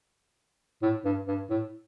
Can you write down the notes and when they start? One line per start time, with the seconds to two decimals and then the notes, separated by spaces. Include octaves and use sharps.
0.82 A2
1.05 G2
1.28 G2
1.50 A2